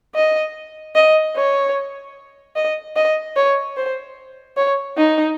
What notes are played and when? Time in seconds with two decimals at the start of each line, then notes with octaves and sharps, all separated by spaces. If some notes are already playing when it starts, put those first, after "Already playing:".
0.15 D#5
0.95 D#5
1.35 C#5
2.56 D#5
2.96 D#5
3.36 C#5
3.77 C5
4.57 C#5
4.97 D#4